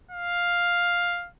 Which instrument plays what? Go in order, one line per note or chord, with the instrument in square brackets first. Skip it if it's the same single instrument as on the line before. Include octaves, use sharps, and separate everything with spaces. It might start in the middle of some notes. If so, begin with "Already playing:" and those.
[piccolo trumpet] F5